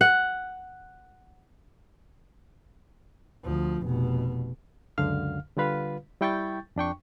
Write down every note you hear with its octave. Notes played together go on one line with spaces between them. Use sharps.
F#5
D2 F3
F1 B2
C#2 F#2 D3 F5 F6
D3 G3 F4 B4 F5
G3 E4 G5 C#6 G6 A6
F2 D4 G5 C#6